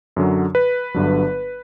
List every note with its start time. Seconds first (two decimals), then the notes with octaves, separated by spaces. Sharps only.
0.16 F#2 D3 F#3
0.55 B4
0.94 G1 G2 D3 F#3